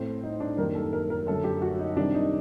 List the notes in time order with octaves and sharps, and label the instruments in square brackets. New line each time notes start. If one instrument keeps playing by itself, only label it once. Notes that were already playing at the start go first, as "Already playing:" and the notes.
Already playing: [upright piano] A2 A3 C4
D#4
D4
F#2 D#3 G3 A#3 A#4
A4
A#4
A#4
F#2 D3 A3 A4
G4
F#4
D#4
C3 D#3 G3 D4
D#4